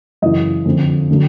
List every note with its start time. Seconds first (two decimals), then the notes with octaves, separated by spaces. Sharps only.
0.22 F#2 C#3 E3 D#5
0.65 F2 D3 F3
1.11 D3 F#3